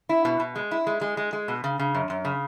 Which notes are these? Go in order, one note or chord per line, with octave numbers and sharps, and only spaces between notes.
E4
B2
B2
G#3
E4
G#3
G#3
G#3
G#3
B2
C#3
C#3
F#2
F#2
C#3